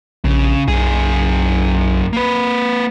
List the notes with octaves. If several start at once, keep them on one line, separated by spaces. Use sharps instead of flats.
A#1 C#3
B1 F#2 G#4
A#3 B4